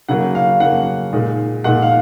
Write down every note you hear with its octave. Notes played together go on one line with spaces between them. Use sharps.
C#3 F#3 A#3 F#5
F5
C#3 F#3 A#3 F#5
A#2 G#3 D#4
A#2 G#3 D#4 F#5
F5